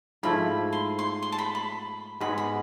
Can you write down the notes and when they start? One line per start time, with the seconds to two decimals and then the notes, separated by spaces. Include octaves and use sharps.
0.23 G#2 F3 A3 E4 B5
0.73 C6
0.99 C6
1.23 C6
1.32 A5
1.38 B5
1.55 B5
2.20 G#2 G#3 B3 B5
2.38 B5